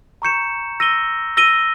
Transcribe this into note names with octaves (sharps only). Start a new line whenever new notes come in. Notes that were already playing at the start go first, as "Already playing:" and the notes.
A#5 C#6 G6 C#7 E7
E6 A#6 D#7 G7
E6 A#6 D#7 G7